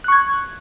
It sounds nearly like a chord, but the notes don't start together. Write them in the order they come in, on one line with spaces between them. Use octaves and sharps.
F#6 C#6 G#6